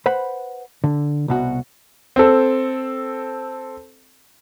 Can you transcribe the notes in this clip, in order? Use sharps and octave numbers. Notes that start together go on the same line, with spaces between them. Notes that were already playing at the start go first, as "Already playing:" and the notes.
B4 C5 F#5 B5
D3
C2 B2 F#4
C4 A4